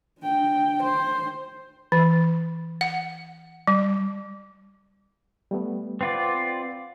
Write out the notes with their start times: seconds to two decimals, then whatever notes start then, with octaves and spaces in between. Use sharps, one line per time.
0.21 D4 G5
0.83 C5
1.92 E3
2.81 F#5
3.67 G3
5.51 G3 A3 B3
6.01 C4 F4 B4 D5 F#5